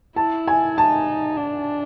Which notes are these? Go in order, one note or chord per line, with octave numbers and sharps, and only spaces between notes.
E4 A5
G#5
D#4 A5
D4